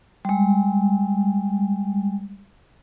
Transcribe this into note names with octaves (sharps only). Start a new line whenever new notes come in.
G3 G#3